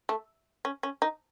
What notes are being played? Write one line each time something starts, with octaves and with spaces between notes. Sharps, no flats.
A3
C#4
C#4
D#4